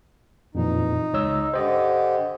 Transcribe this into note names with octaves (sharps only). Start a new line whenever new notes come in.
F2 A#2 E3 D#4
C#2 C#5 E6
D3 G4 C5 D#5